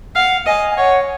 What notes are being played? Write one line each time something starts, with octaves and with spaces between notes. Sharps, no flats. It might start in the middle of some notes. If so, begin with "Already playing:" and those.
F5 F#5
D#5 G#5
G#5
C#5 F#5